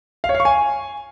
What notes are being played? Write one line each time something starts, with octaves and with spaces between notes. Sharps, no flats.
F5
C#5
F5
C#6
G#5